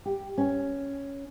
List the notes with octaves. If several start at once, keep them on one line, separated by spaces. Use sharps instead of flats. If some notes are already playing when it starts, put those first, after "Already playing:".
G4
C#4